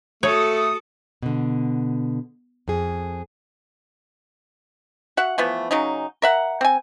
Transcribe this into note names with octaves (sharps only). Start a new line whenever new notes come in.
A3 F#4 A4 C#5 D#6
B2 D3
F2 G#4
F#4 E5 F#5
E3 F3 A3 B3
C#3 F#3 C#4 D#4
A#4 E5 F#5
C4 G#5